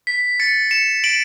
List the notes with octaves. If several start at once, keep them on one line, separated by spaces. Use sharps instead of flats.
B6
A6 C#7
C#7 E7
D7 F#7